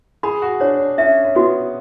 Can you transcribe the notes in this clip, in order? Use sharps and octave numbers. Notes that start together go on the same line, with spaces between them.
G#4 B5
F#4
D4 C#5
D4
C#4 E5
C#4
B3 F#4